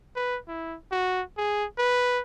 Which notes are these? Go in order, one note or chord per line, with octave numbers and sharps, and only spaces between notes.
B4
E4
F#4
G#4
B4